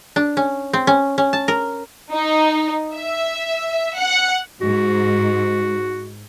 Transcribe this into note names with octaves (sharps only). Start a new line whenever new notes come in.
D4
C#4
C4
C#4
C#4
A5
A#4
D#4
E5
F#5
G#2 F#4